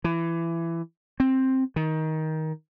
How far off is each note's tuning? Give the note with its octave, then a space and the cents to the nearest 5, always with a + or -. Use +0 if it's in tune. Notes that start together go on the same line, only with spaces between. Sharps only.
E3 +20
C4 +10
D#3 +15